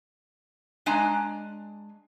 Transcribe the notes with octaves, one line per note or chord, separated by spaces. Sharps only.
G#3 D4 G#5 A#5